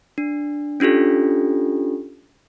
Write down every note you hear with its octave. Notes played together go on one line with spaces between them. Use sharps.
D4
C#4 D4 F4 G4 A4